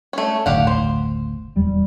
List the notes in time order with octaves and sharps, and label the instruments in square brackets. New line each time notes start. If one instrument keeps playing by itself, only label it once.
[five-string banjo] A3 C#4
[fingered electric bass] F#1 D2 A2 [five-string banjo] G4 F5 F#5
[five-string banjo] C5
[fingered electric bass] D#1 E2 [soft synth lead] G3